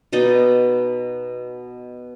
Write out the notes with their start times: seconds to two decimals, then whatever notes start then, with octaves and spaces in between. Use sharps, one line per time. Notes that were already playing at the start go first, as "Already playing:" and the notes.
0.13 B2 D#4 D5 D#5